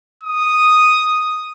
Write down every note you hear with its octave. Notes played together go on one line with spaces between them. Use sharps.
D#6